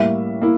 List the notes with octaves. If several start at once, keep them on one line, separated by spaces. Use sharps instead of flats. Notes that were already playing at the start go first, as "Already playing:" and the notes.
Already playing: A2 G3 A#3 E5
A#3 E4